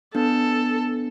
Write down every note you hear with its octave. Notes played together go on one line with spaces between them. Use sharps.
B3 D4 A4